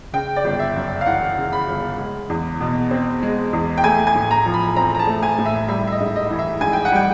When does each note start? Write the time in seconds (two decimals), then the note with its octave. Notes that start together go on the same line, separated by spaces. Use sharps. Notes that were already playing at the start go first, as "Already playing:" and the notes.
0.13 C#3 G5
0.36 D5
0.44 G1
0.59 E5
0.76 F#2
1.01 F5
1.06 E3 F#5
1.37 C#3
1.53 B5
1.68 G1
1.98 G#3
2.30 E2
2.60 B2
2.91 C4
3.22 G#3
3.53 E2
3.78 G5
3.84 A3 G#5
4.07 G#5
4.15 A2
4.31 A#5
4.46 F3
4.54 B5
4.76 C4 A#5
4.95 A#5
4.99 A5
5.07 A3
5.23 G#5
5.38 A2
5.46 E5
5.68 G3 E5
5.87 E5
5.92 D#5
6.00 G#2
6.16 D#5
6.30 E3
6.39 E5
6.61 G#2 G#5
6.73 G5
6.85 F#5
6.92 G3 G5